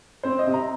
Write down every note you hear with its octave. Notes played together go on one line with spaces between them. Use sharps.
C4 C5
D#5
C3
A#5